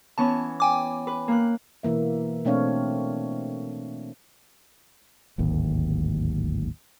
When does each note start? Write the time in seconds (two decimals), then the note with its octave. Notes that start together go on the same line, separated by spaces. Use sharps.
0.18 E3 B3 C#4 A5
0.60 G5 G#5 D6
1.07 B4
1.28 A#3 F#6
1.83 B2 E3 A#3 E5
2.45 B2 A3 C4 D4 C#5 F5
5.38 D1 G#1 D#2